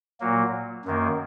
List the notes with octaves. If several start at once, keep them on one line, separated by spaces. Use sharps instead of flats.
A#2 F#3 A#3
F#2 D#3 A#3